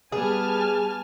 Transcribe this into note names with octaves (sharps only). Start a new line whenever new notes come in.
G3 B3 G#4 G#5 A5 F6